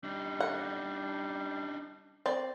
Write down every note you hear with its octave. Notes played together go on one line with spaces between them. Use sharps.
G3 D4 D#4
F#5
C4 D5